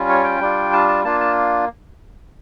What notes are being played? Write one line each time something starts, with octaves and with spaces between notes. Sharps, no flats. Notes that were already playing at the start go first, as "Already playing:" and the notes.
Already playing: G3 C#4 F4
C#5
G5
G3 D4 F4
A5
A5
A#3 D4 F4 A5
A5